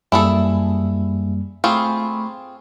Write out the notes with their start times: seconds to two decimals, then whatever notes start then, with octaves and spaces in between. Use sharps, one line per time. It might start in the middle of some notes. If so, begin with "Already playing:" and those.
0.12 F#2 G3 A#3 E4 G#4 A4
1.64 A3 C4 F4 G#4 B5 C#6